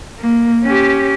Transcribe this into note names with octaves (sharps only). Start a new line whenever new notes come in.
A#3
C#4 G4